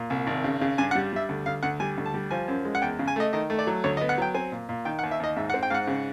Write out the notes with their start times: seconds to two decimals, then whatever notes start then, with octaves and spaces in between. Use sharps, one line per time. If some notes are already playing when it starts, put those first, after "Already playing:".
Already playing: A#2
0.10 C2
0.27 G#1
0.44 C#3
0.61 C#3
0.78 G2 G#5
0.91 F#5
0.95 G3
1.13 G3 E5
1.29 D2
1.46 D2 F5
1.63 D2 F#5
1.80 G3 G#5
1.98 D2
2.06 A5
2.14 G3
2.31 F3 G#5
2.48 F#2
2.65 G#3
2.75 F#5
2.82 E2 G5
2.99 C#3
3.08 G#5
3.16 A3 D#5
3.33 D#3 D#5
3.50 A3
3.59 D5
3.67 F#3
3.84 D2 C#5
3.97 D#5
4.01 B3
4.09 F#5
4.18 F#3 G5
4.34 C4 G#5
4.52 A#2
4.69 A#2
4.85 D#3 G5
4.99 F#5
5.03 D#2
5.11 E5
5.20 D#2 D#5
5.36 G#2 E5
5.50 F#5
5.54 C4
5.63 G5
5.70 G#2 F5 F#5
5.87 C#3